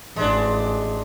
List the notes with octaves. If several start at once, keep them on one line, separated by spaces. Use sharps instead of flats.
A1 G#3 D4